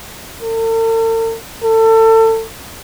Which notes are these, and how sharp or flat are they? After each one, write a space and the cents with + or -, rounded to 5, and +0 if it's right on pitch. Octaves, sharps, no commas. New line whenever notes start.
A4 +45
A4 +30